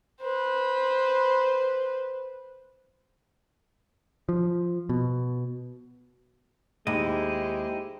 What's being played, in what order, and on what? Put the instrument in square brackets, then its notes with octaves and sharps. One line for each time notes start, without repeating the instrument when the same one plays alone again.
[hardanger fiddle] B4 C5
[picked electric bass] F3
B2
[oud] D#2 [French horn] G#3 [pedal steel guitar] D#4 E4 D#5 [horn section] G4 C5